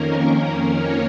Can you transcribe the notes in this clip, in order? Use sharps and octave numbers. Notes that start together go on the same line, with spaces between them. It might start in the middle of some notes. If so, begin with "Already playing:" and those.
Already playing: F2 D#3 A#3 C#4 A#4
A#4
C#5